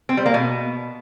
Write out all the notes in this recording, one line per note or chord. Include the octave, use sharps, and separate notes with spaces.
C4
G3
A#3
B2